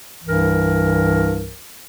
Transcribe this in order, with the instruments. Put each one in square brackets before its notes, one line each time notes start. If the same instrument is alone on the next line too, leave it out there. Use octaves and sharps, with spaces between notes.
[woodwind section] C2 G2 E3 A#4